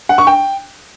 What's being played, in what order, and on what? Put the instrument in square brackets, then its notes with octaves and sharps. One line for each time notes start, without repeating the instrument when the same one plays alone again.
[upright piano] F#5
C#6
G5